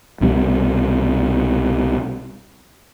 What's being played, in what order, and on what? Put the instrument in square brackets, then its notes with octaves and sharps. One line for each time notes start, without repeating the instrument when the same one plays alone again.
[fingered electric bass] C2 B2 D3 G3